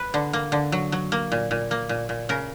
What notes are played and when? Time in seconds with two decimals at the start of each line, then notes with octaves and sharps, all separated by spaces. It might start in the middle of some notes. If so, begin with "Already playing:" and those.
Already playing: B4
0.14 D3
0.33 A#3
0.52 D3
0.72 F#3
0.92 F#3
1.12 A#3
1.32 A#2
1.51 A#2
1.71 A#3
1.89 A#2
2.09 A#2
2.29 C#3 A#4